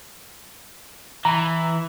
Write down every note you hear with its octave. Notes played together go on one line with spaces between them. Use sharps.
E3 A#5